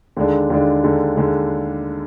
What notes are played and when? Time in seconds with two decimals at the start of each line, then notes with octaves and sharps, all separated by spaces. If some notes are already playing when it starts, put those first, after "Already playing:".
0.17 D#2 D3 G#3 D4
0.50 D#2 D3 G#3 D4
0.83 D#2 D3 G#3 D4
1.17 D#2 D3 G#3 D4